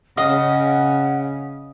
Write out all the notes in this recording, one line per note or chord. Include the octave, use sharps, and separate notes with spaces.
C#3 D#5 F5 F#5 D#6